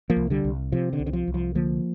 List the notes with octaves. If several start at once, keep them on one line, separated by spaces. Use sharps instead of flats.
F3 A#3
C2
D3 G3
C2
C3 F3
D3
C2
D3
F3
C2
F3
D3 F3 A#3